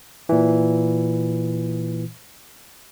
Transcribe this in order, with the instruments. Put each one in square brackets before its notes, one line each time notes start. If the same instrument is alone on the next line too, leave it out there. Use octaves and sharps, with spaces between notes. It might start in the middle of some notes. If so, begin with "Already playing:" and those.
[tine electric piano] A#2 E3